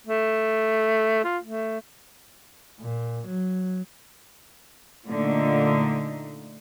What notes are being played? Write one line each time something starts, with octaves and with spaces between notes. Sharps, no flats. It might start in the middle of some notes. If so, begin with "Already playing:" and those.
A3
F4
A3
A#2
F#3
A#2 D3 A3 D#4